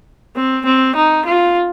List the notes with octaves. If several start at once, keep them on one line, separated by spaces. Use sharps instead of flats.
C4
C4
D#4
F4